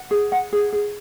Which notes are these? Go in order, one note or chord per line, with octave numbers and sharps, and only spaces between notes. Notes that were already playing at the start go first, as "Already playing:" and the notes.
Already playing: F#5
G#4
F#5
G#4
G#4